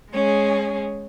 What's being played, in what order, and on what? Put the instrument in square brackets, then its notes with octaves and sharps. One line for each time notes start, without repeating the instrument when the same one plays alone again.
[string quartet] G#3 C#4 G#4